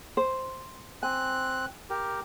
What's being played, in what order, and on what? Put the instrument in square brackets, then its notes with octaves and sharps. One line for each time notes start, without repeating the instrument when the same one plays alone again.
[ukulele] C5
[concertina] C4 F#6 [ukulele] G#5
[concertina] G4 A#4